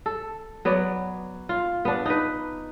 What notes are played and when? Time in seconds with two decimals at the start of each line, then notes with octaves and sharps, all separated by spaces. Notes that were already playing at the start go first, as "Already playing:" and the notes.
0.06 A4
0.65 F#3 B3 D5
1.49 F4
1.85 B3 D4
2.06 D#4 B4